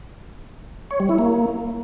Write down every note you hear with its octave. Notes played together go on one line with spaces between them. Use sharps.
C#5
G3
E4
A#3